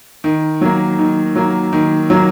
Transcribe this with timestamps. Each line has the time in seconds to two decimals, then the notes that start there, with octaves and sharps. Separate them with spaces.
0.24 D#3
0.61 F#3 A#3
0.99 D#3
1.36 F#3 A#3
1.73 D#3
2.10 F#3 A#3